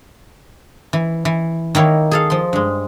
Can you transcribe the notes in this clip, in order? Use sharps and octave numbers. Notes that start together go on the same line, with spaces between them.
E3
E3
D#3 A#3 E4 C#5
G#4 A4 F5
F3 C6
G2 G#3